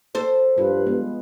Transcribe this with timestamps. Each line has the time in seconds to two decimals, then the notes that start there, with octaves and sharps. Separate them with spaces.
0.15 A4 C5
0.58 G2 F4 B4
0.87 G#3 B3